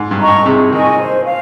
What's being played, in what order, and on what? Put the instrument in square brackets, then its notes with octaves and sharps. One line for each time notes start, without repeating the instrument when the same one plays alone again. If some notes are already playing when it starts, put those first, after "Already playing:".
Already playing: [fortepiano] G#2
G2
[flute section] D#5 A#5 C#6
[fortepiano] G#2
[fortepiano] C3 [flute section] G#4
[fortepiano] D#3 [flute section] D#5 G#5 C#6
[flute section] C5
F5